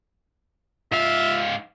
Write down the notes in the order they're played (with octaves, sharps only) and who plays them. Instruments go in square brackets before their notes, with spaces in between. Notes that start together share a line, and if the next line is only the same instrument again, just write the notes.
[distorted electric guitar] G#2 F5 [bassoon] F4 [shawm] E5